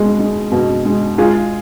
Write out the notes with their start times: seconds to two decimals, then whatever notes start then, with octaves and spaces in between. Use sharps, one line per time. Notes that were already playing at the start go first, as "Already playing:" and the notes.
Already playing: B2 G#3
0.19 G#3
0.52 B2
0.85 G#3
1.18 G#3 F4 G#4